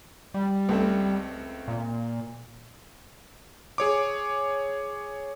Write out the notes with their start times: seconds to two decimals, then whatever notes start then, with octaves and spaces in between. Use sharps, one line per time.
0.34 G3
0.69 C#2 A3 C4
1.68 A#2
3.78 G#4 C#5 D6